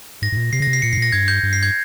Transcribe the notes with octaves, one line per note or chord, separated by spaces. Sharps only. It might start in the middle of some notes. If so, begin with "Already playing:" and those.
G#2 A#6
G#2
A#2
C3 C7
C#3 A#6
C3
C7
A#2 C#7
G#2 C7
A#2 A#6
G2 G#6
G6
G2
C7
G#6